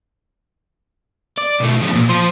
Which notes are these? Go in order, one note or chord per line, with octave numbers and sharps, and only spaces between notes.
D5
B2 A3
A2 F3
A#2
F3 C5